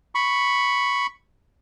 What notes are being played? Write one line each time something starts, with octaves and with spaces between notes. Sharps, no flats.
B5 C#6